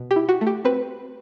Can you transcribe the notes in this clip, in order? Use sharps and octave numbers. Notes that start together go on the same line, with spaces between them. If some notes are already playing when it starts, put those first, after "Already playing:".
Already playing: B2
G4
E4
F#4
A3
G4
C4 B4